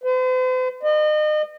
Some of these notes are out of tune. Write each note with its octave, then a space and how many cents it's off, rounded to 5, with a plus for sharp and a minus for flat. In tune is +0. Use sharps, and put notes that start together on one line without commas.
C5 -45
D#5 -35